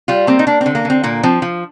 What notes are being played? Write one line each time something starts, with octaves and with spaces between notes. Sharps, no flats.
G3 F4
A#3 C4
D#4
A#3 D4
D3 C4
A#3
D3 C4
A#2 A#3
F3 C4
F3